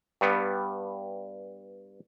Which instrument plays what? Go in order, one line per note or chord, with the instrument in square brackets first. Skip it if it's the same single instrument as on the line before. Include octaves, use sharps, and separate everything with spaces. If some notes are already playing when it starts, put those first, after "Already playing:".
[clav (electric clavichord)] G2 G3 B3